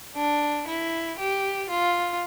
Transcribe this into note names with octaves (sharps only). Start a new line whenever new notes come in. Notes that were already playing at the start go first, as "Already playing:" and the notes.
D4
E4
G4
F4